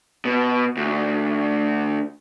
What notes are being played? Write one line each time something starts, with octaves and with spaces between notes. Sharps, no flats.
B2
D2